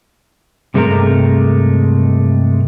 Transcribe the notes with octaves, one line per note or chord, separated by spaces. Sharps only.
G2 C3 G#3 A3 A#4 A#5